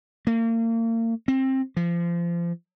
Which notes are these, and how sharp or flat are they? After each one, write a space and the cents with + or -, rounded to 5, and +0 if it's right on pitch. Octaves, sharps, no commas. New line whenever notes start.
A#3 -35
C4 +20
F3 -30